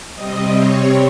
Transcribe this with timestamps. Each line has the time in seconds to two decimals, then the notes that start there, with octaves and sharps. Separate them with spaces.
0.14 C3 G3 C4 D#5 D#6
0.56 C#5 C#6